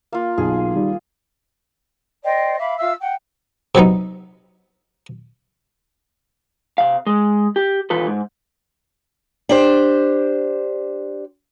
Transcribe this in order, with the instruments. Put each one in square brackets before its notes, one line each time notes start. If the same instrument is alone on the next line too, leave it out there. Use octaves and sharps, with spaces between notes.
[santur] A#3 F4
[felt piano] B1 [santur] G#4
[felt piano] D#3 G3
[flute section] C5 D5 D#5 G5
E5 F5 B5 D6
F4 E5 F5 E6
F#5 G5
[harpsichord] C3 F#3 B3 D#4
[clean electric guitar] C3 F5
G#3
G4
D#2 A#2 E3 F4 A4 B4
G#2
[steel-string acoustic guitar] D4 G4 C5